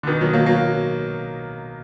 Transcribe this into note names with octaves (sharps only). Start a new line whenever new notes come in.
D3
B2 D#3
D#3 F#3
F#3 A#3
F#3 A#3